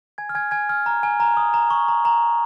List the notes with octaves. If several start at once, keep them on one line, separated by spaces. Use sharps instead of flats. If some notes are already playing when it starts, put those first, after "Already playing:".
G#5 G#6
F6
G#5 G#6
G#5 G#6
F6
A#5
G#5
A#5
D#6
A#5
C#6
A#5
A#5